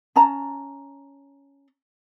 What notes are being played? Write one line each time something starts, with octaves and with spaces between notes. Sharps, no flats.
C#4 A5 A#5